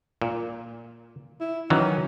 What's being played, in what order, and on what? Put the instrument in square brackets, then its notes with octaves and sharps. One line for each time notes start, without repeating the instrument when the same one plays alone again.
[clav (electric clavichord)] A#2
[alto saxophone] E4
[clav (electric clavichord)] D#3 E3 F#3 [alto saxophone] C#4